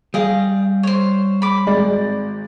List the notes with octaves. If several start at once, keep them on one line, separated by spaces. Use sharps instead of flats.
G3 G#4 D#5 F5
C5 C#5
B5 D6
G#1 G#3 D5